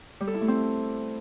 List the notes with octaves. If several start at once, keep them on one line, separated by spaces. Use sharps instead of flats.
G3
A4
E4
A3
C4